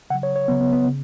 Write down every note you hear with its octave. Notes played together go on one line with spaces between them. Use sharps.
C#3 F#3 F#5
C#5
C#5
C#3 F#3 B3
B3
B3
C#3